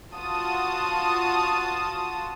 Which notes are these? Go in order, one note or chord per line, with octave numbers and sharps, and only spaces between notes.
F4 F#4 A5 D#6